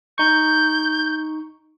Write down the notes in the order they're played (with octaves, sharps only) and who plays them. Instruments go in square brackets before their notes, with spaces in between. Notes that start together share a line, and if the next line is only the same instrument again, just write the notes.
[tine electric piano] D#4 C#6 [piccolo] G6